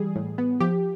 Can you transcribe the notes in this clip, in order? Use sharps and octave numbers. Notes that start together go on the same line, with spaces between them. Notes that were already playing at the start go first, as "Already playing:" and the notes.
Already playing: E3 G3 G#4
A2
B3
F3 G4